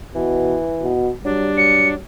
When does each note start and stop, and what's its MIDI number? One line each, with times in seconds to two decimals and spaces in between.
0.15 0.56 47
0.15 0.94 52
0.83 1.10 47
1.24 1.51 54
1.24 1.96 55
1.24 1.94 62
1.57 1.97 54
1.57 1.88 97